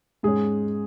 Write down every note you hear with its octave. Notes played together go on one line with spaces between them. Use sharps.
G#2 G#3 C#4 G#4